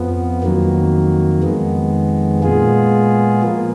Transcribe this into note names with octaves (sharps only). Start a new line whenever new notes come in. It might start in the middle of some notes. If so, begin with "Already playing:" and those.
Already playing: F2 F3 B3
F2 D#3 F#3 A#3
F2 D#3 G#3 B3
A#2 G#3 B3 F4 G#4
F3 A#3